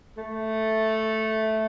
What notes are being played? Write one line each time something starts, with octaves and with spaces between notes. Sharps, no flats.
A3